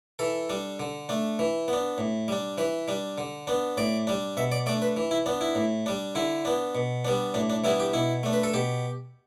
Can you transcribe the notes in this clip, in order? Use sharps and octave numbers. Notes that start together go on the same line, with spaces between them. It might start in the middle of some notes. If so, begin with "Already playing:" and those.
E3 A4
G3 D4
D3
A3 D4
E3
B3
D4
A2
G3 D4
E3 B4
G3 D4
D3
B3 D4
A2 D5
G3 D4
B2 E5
D5
A3 D4 D5
B4
E3
E4
B3 D4
E4
A2
G3 D4
D3 E4
B3 D4
B2
G3 B3 D4
A2 D4
D4
E3 G3 B3 D4 E4
G4
B2 E4
A3 D4
B4
A4
B2 G4